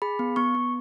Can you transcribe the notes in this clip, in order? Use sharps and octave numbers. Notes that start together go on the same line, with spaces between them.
G#4 B5
B3
B3 C#6
B3